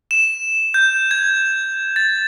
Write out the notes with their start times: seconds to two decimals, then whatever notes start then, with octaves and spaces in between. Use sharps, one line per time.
0.11 E7
0.74 G6
1.11 G#6
1.96 A6